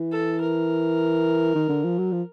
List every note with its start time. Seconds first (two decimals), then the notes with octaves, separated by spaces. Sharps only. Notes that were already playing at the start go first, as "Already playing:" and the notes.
Already playing: E3
0.12 A4
0.41 A#4
1.55 D#3
1.69 D3
1.84 F3
1.98 F#3
2.12 F3